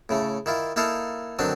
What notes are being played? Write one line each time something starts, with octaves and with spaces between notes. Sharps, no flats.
A2 C#3 A3
D#3 E4 F4
A#3 D#4 E4 A4 F5
D3 D#3 F#3 C4 D4